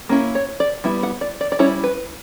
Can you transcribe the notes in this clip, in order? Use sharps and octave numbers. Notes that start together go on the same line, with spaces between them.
A#3 C#4 E4
C#5
D5
G3 B3 E4 E5
F#5
D5
D5
D5
G3 C#4 E4 C#5
B4